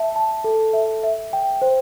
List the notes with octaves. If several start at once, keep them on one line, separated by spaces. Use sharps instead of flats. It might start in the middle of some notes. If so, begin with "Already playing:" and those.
Already playing: E5 A5
A5
A4
E5
E5
G5
C5